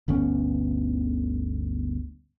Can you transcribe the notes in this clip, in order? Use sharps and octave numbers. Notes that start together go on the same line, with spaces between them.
G1 D2 B3 C#4